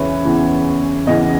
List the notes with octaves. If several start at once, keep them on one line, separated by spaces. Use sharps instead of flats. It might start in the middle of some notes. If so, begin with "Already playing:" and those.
Already playing: E2 C#3 E3 B4 C#5 E5
E2 C#3 E3
E2 C#3 E3 D#5